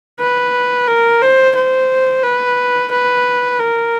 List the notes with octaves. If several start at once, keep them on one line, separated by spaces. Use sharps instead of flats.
B4
A#4
C5
C5
B4
B4
A#4